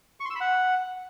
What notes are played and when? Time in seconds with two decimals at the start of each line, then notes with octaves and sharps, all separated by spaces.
0.20 C#6
0.25 C6
0.30 E6
0.35 B5
0.40 F#5